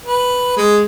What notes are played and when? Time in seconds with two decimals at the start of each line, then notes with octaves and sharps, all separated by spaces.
0.06 B4
0.57 G#3